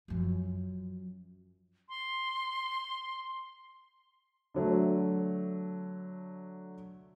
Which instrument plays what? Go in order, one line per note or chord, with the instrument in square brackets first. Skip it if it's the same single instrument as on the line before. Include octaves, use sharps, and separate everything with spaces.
[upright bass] F#2 F3
[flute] C6
[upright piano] D3 F#3 A3